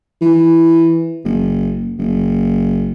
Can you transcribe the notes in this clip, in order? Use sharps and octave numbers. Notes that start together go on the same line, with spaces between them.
E3
F#1
F#1